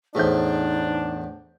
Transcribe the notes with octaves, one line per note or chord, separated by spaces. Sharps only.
E2 A2 D4 D#4 G#4 C5 G6